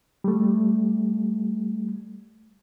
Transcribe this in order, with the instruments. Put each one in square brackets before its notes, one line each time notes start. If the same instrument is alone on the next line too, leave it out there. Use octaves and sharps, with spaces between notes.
[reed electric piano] G3 A3